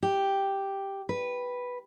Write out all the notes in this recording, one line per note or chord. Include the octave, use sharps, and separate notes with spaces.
G4
B4